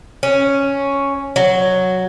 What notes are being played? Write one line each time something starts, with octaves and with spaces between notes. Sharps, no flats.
C#4
F#3